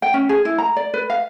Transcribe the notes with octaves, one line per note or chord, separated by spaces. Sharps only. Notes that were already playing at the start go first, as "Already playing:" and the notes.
G5
C#4
G#4
E4
A#5
D5
B4
F5